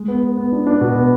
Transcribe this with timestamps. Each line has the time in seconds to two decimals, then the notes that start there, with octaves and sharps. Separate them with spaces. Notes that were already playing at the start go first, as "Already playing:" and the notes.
Already playing: G#3
0.08 B3
0.22 B3
0.37 B3
0.52 D4
0.67 D4
0.81 B2
0.95 B3